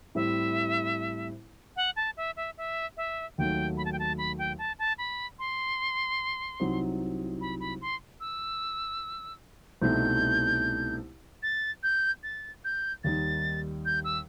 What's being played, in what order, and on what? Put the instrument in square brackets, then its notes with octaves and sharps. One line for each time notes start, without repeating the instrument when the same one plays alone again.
[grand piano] A2 G3 C4 E4 [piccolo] E5
[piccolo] F#5
A5
E5
E5
E5
E5
[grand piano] D#2 D#3 F#3 A3 [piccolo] G5
[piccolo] B5
A5
G5
A5
B5
G5
A5
A5
B5
C6
[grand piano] C2 C3 F#3 C4 D#4
[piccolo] B5
B5
C6
E6
[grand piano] C2 B2 A3 C4 D#4 [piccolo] G6
[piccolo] A6
G6
A6
G6
[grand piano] D#2 D#3 G3 D#4 [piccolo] A6
[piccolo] G6
E6